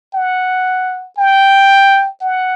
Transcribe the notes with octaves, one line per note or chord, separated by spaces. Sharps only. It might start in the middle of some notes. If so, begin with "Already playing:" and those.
F#5
G5
F#5